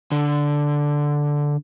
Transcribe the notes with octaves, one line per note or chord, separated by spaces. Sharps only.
D3